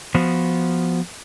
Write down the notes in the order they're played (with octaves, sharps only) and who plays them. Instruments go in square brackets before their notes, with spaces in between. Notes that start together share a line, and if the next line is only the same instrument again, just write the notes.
[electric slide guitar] F3 B3 F#4 C5